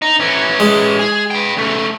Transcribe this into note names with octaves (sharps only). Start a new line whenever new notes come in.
D#4
E3 C#4
G#3
G#4
B4 G5
C#3 A3